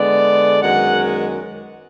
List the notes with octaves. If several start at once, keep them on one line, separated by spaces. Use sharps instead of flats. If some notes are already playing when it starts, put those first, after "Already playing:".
Already playing: D3 G#3 B3 D5
F#2 D#3 G#3 B3 F#5